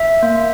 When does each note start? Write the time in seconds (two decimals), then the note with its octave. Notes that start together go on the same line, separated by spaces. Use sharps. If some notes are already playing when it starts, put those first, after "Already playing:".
Already playing: E5
0.23 A#3